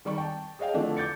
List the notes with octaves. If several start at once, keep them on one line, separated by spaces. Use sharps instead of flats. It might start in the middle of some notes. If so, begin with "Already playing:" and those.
D#3 G3 D5 C#6
G5 A5
G#4 C#5 D#5 F5 G5
D3 E3 F3 A3 D4
D6 G6 A6 C#7